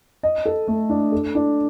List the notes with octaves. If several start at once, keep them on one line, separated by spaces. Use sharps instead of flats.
D#5
A4
A3
D4
A4
D4